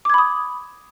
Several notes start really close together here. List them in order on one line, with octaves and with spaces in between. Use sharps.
D6 G#6 B5 D#6